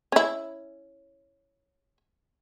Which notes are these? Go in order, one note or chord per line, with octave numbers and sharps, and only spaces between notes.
C#4 E4